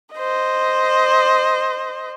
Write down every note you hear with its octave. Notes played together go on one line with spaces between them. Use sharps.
C5 D#5